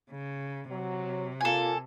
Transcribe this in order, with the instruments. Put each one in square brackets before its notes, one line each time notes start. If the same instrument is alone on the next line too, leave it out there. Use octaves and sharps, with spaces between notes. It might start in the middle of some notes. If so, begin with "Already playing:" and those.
[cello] C#3
[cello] C3 [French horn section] F#3
[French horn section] A#2 A#3 F4 [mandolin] A4 G#5